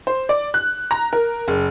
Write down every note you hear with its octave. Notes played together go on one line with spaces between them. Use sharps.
C5
D5
F#6
A#5
A#4
F#1